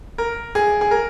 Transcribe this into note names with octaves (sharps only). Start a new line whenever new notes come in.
A#4
G#4
G#4
A#4